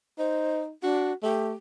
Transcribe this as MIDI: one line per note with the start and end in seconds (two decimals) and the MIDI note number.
0.19 0.71 63
0.19 0.60 72
0.83 1.13 62
0.83 1.13 66
1.23 1.53 57
1.23 1.53 67